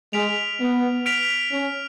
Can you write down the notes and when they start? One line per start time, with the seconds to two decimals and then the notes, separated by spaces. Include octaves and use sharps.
0.13 G#3 F6 B6 D7 F7
0.59 B3
1.06 F6 B6 D7 F7
1.52 C#4